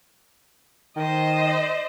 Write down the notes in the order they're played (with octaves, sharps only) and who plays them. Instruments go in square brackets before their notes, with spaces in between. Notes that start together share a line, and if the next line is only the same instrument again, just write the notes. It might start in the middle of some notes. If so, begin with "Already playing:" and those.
[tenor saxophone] D#3 [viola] C5 D#5